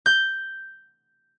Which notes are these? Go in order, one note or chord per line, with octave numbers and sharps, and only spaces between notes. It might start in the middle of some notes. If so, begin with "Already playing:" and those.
G6